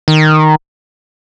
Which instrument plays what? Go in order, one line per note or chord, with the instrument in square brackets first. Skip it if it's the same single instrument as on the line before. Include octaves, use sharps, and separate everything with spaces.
[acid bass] D#3